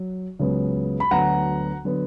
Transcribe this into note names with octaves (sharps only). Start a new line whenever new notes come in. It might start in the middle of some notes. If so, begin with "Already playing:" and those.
Already playing: F#3
C#2 C#3 F#3 B3
B5
D2 D3 F#3 B3 F#5 A#5
D3 F#3 B3